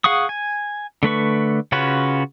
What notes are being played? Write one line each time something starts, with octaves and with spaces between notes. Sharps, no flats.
G#4 F5 F#5 C#6 D#6
G#5
D3 A3 B4 C#6
C#3 C#4 F4 F#4 B4